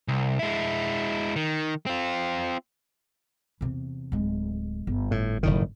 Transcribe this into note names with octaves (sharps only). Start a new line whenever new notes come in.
C2
G#3 E4
D#3
C4 F4
E2 C3
D1 G#3
G1
A2
F#1 A2 D#3